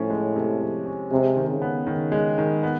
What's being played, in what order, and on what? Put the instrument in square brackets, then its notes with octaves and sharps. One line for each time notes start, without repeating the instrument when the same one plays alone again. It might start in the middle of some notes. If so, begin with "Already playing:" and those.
Already playing: [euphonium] A2 [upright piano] F3 C#4
[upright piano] G#3
C3
F3
C#4
[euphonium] C3 [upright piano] G#3
[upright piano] D#3
[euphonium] C#3
[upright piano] B3
D#3
G#3
D#3
B3